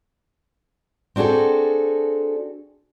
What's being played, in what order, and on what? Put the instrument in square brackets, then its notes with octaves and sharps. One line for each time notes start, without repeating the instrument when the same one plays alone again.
[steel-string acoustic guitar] C4 D4 F#4 G#4 A4